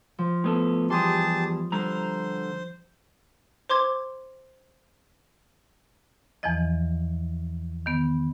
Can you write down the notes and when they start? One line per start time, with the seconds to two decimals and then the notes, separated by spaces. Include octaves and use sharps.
0.18 F3
0.44 A2 B3 A4
0.90 E2 G3 G4 G#4 A5 C6 D#6
1.72 D3 G3 C5 A#5
3.69 C5 C6 D6 G#6
6.43 E2 E3 F3 D#5
7.86 D#3 B3